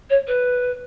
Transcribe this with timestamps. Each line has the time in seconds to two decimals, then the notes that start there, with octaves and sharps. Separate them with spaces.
0.10 C#5
0.27 B4